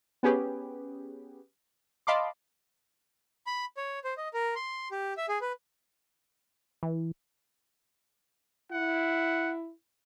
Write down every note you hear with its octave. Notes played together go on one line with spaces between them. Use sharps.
B3 C#4 G4 G#4 B4
D#5 F5 A5 B5 C6 D6
B5
C#5
C5
D#5
A#4
C6
G4
E5
G#4
B4
E3
E4 F#5